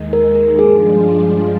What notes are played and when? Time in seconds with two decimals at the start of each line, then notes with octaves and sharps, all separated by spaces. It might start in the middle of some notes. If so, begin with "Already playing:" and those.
Already playing: D#2 D#3 G#3
0.13 A#4
0.35 A#4
0.58 G2 F3 G#3 D4 F4 G#4